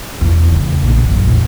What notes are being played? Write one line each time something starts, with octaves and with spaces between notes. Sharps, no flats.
E2 E3
C#3 A3
A#1
C#2 F#2
A#1 E2